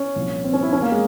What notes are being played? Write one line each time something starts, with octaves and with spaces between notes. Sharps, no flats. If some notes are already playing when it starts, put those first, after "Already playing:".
Already playing: C#4
C2 A#2 F3
C4
C#4
E4
E2 E3 C#4
A#3
G#3